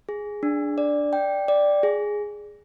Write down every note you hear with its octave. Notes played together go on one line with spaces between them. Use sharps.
G#4
D4
D5
G5
D5
G#4